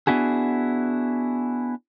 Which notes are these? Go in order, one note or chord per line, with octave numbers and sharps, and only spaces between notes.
B3 D4 E4 F#4 G#4